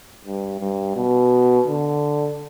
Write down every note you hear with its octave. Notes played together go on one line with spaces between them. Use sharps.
G2
G2
B2
D3